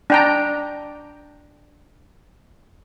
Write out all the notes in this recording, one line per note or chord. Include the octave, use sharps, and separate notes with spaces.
D4 G5 A#5